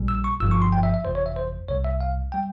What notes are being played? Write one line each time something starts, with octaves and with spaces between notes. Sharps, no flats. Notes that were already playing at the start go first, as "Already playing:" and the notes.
Already playing: A#1 A#2 G3
E6
C#6
G1 G2 F3 E6
C#6
C6
G5
E5
E5
G1 F2 C3 E3 C5
C#5
E5
C5
C2 C3 G3 C#5
E5
F5
G3 G5